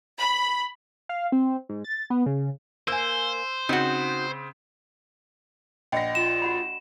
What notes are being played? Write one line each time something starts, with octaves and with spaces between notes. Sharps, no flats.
B5
F5
C4
G#2
A6
B3
C#3
A#3 C5 G#5 E6
C#3 C4 D#4 F#4
A#1 D#5 F#5 G5 A#6
F4 E7
F#4 F#5 B5